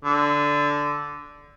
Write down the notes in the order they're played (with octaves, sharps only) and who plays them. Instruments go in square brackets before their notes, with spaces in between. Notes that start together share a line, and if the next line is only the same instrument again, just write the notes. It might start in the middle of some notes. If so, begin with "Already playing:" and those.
[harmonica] D3